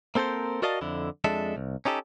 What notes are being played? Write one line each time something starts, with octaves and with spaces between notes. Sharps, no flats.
A#3 C4 A4 A#4 C5
F#4 A#4 D5 D#5 F5 A5
F2 D3 E4
F2 G#3 D4 A4 E5
C2
C#4 D#4 G4 A4